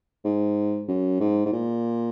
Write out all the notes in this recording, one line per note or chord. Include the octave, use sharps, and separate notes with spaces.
G#2
F#2
G#2
G#2
A#2